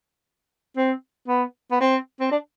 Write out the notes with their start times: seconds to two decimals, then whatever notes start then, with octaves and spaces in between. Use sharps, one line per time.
0.77 C4
1.28 B3
1.72 B3
1.81 C4
2.20 C4
2.31 D4